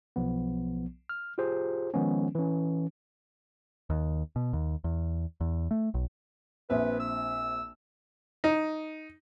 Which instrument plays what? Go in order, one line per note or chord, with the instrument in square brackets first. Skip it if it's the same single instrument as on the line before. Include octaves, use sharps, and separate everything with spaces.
[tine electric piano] B1 F3 B3
F6
F4 G4 G#4 C5
D#3 F3 G#3 B3 C#4
E3 C#4
[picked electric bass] D#2
B2
D#2
E2
E2
A3
B1
[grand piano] A#1 C4 E5 [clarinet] B4
[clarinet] E6
[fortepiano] D#4